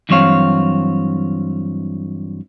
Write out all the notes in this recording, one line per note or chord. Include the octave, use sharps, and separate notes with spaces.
G2 E3 F#3 C4 C#5 F5